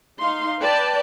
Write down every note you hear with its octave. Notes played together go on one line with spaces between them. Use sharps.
D#4 F5 C6
B4 D5 G5 A5